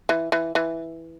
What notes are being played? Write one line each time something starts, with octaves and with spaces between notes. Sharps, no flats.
E3
E3
E3